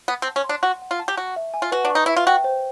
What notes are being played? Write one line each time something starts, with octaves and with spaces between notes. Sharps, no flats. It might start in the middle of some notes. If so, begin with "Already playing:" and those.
B3 F#5
C4
A5
C#4
C6
D4
F#4 F#5
F#5
F4
A5
G4
F#4 C#6
E5
G#5
F4
F#4 B4
D4
C#6
D#4
E4 E5
F4
F#4 G5
C5